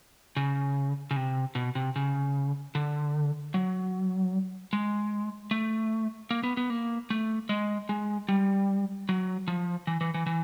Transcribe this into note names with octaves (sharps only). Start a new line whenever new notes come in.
C#3
C#3
C3
B2
C3
C#3
D3
F#3
G#3
A3
A#3
B3
B3
A#3
A3
G#3
G#3
G3
F#3
F3
E3
E3
E3
E3